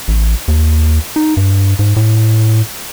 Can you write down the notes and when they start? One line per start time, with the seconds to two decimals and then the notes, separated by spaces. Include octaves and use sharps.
0.08 A1
0.48 D#2
1.16 D#4
1.37 G2
1.79 G#2
1.96 A2